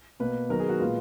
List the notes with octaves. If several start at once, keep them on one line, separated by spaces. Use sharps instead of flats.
B2 A#3 B4
D#3 F#3 B3 A#4
G#4
F#4
A#2 G#3 B3 F4